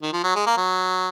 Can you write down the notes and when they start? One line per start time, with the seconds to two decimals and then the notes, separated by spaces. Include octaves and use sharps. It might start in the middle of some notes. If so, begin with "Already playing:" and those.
0.03 D#3
0.13 F3
0.24 F#3
0.35 G#3
0.47 A#3
0.57 F#3